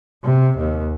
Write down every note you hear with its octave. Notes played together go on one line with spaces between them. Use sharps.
C3
D#2